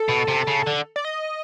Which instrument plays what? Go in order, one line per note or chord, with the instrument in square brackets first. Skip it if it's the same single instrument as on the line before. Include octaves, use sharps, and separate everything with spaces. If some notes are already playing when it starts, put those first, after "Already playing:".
Already playing: [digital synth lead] A4
[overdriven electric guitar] B2
C3
C#3
D3
[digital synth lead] D5
D#5